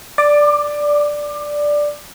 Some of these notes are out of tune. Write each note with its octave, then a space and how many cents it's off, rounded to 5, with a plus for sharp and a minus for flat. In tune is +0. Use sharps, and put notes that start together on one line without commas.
D5 +0 D6 +25